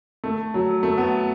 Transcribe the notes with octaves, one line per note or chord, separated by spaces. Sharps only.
A3
F#3
A3
B3